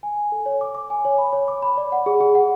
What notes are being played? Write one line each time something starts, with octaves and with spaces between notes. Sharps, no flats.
G#5
G#5
A4
C#5
D6
D6
G#5
C#5
B5
C#5
D6
B5
D5
F#5
G#4
G#4
F#5